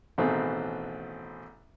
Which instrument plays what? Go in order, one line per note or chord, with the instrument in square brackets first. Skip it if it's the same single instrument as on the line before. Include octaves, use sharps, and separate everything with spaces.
[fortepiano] A1 B2 D#3 A3 C4 G#4